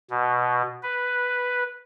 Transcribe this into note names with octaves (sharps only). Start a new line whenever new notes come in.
B2
B4